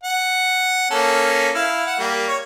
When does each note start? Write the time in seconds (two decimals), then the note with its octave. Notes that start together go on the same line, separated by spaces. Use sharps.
0.03 F#5
0.91 A#3 C#4 A4
1.55 E4 F5
1.87 F#5
1.99 G3 A#3
2.28 C#5